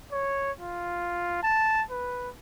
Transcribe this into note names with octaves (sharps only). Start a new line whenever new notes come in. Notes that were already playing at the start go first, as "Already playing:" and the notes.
C#5
F4
A5
B4